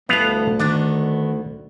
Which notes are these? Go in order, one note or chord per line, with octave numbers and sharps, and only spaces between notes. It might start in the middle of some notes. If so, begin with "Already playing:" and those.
D2 G3 B3 E4 A4 B4 F5
D#3 A3 B3 D4